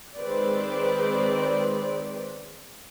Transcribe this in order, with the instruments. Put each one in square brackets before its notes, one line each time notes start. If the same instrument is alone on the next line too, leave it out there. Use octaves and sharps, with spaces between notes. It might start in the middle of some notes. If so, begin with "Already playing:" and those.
[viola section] D#3 G#3 C4 B4 C5 D5